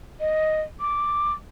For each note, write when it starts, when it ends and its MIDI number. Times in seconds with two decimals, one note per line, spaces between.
0.20 0.62 75
0.80 1.32 86